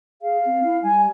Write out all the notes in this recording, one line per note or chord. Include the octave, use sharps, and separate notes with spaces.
G#4 F5
C4
E4
G3 G#5